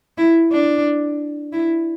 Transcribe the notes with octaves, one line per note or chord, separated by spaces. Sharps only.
E4
D4
E4